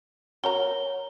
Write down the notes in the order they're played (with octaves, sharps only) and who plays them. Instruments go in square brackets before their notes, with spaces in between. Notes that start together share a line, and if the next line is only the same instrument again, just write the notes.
[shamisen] F#4 A#4 A#5 [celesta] C#5 G7